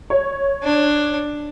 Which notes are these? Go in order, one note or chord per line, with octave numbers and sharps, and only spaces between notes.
C#5
D4